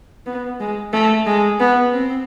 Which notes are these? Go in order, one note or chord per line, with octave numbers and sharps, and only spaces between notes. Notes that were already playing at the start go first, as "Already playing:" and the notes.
B3
G#3
A3
G#3
B3
C4